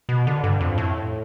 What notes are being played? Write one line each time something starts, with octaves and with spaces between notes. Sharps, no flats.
B2
D3
G2
F2
A2